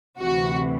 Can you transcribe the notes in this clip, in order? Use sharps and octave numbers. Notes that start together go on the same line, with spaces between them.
D2 C3 E3 F#4